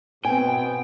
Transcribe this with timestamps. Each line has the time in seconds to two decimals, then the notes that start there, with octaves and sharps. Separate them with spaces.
0.25 B2 B3 C4 G5 G#5